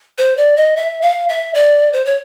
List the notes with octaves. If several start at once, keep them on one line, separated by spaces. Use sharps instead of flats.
C5
D5
D#5
E5
F5
E5
D5
C5
C#5